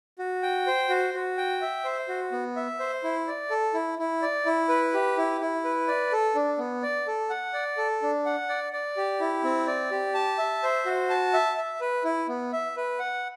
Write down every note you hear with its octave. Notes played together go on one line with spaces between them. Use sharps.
F#4
G5
C5
F#4
F#4
G5
E5
C5
F#4
B3
E5
C5
E4
D5
A4
E4
E4
D5
E4
B4
G4
E4
E4
B4
D5
A4
D4
B3
D5
A4
F#5
D5
A4
D4
F#5
D5
D5
G4
E4
C4
D5
G4
A5
E5
C5
F#4
A5
E5
E5
B4
E4
B3
E5
B4
F#5